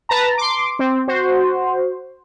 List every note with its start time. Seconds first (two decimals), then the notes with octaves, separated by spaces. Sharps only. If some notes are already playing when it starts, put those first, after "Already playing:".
0.09 B4 A5 A#5
0.38 C6 D6
0.79 C4
1.08 F#4 C5